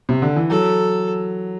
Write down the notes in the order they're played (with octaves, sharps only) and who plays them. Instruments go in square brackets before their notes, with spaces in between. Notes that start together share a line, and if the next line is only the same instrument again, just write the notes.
[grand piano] C3
D3
E3
[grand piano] F#3 [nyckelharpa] A4